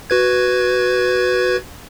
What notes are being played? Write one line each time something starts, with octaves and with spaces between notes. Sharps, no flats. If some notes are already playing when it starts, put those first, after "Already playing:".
F#4 B4 G#6